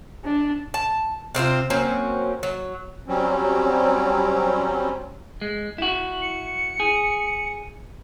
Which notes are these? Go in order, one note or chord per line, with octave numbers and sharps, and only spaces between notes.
D4
A5
C3 C4 E4 F4
F#3 A#3 C4 C#4
F#3
F#3 G3 C4 C#4
G#3
E4 F#4
C#7
G#4